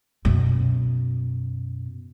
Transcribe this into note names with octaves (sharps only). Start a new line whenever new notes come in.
F#2 B2